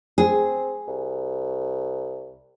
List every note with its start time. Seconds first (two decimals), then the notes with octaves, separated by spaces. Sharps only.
0.18 C4 G#4
0.87 C2